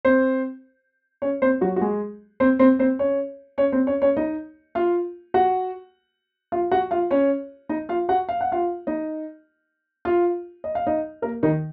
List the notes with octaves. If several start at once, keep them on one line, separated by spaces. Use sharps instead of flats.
C4 C5
C#4 C#5
C4 C5
F#3 F#4
F#4
G#3 G#4
C4 C5
C4 C5
C4 C5
C#4 C#5
C#4 C#5
C4 C5
C#4 C#5
C#4 C#5
D#4 D#5
F4 F5
F#4 F#5
F4 F5
F#4 F#5
F4 F5
C#4 C#5
D#4 D#5
F4 F5
F#4 F#5
F5
F#5
F4 F5
D#4 D#5
F4 F5
D#5
F5
D#4 D#5
A#3 A#4
D#3 D#4